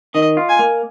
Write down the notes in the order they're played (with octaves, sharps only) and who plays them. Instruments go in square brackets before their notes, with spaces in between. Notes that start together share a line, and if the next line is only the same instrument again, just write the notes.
[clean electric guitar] D#3 [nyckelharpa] D#5
[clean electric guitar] F4
[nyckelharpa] G#5
[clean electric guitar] A#3